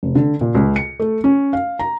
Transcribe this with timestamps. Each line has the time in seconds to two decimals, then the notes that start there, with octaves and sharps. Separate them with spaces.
0.03 F1
0.15 D3
0.41 A#2
0.55 C#2
0.76 C#7
1.00 A3
1.24 C#4
1.53 F5
1.79 A#5